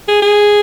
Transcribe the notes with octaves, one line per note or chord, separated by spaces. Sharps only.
G#4
G#4